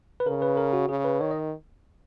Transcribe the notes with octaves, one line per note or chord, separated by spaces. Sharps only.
B4
C#3 A#4
B4
A#4
F#4
C#3 G#4
B4
D#3 C#5
D#5